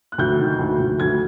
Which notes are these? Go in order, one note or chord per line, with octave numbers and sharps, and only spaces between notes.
F#6
D2 G6
D#3
D2
D2
D2 G#6